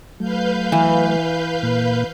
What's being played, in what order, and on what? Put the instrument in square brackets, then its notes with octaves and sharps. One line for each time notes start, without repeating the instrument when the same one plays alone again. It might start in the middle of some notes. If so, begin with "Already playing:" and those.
[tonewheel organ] F#3 A3 [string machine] B4 F5 G6
[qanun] E3
[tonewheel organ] A#2 A#3